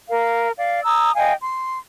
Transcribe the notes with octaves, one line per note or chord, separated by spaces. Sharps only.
A#4 F5
D5 F5
A#5 D#6 E6
D#5 F5 G5 G#5
C6